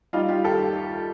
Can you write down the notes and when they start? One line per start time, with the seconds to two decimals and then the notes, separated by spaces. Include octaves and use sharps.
0.13 G3 D#4 F4
0.29 F4 G4
0.44 D#2 G4 A4